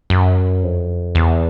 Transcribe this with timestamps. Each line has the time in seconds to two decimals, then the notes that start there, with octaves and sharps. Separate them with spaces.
0.10 F#2
0.63 F2
1.15 E2